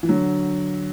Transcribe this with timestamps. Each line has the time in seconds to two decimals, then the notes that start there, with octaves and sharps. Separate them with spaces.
0.03 E3
0.09 D3 F#3